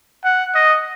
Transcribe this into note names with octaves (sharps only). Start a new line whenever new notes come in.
F#5
D#5